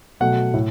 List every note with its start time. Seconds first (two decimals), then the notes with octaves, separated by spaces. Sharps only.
0.20 B2 F#3 A3 F#5
0.54 A2